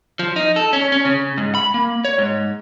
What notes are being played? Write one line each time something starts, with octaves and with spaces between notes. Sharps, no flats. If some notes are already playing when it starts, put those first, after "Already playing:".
F3
D#4
A4
C#4
C#4
C#3
G#2
B5
A#3
C#5
G#2